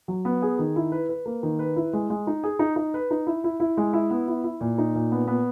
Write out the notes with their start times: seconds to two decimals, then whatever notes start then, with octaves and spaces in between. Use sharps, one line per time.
0.08 F#3
0.25 B3
0.42 G#4
0.59 D#3
0.76 E4
0.92 B4
1.09 B4
1.26 A#3
1.43 D#3
1.59 B4
1.76 E4
1.93 G#3
2.10 G#3
2.27 D#4
2.44 G#4
2.59 D#4
2.76 D#4
2.94 B4
3.11 D#4
3.27 E4
3.44 E4
3.60 E4
3.77 G#3
3.93 E4
4.11 B3
4.28 E4
4.44 E4
4.61 A#2
4.78 D#4
4.95 A#2
5.12 B3
5.28 B3